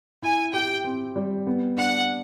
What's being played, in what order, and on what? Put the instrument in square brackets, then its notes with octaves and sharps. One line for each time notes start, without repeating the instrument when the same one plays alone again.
[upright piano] E4 [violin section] G#5
[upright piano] G4 [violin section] G5
[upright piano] C4
G3
B3
[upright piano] D4 [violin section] F#5